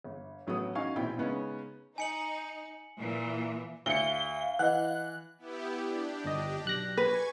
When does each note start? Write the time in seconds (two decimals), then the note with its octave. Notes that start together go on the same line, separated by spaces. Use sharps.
0.04 G1
0.47 A1 F#3 A3 B3 D#6
0.75 C#4 D#4 F#4 F5 G#5 C#6
0.96 A#1 B2 C4 E4 G5 B5
1.17 C#3 G#3 B3 C#4 D#4
1.98 D#4 G#5 C#7 F#7
2.99 A#2 E3
3.86 D2 F5 C#7 G7
4.59 E3 D#5 F#5 F#6
5.38 B3 E4 G4
5.82 D4 G4
6.24 G1 D#5
6.65 B1 F#6 A#6
6.97 B4 G#5 C#6 G#6